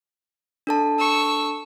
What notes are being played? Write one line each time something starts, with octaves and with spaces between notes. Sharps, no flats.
D4 A4 A5
C#6 E6